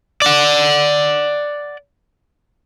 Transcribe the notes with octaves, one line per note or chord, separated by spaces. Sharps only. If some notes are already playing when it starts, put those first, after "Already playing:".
D5 F#5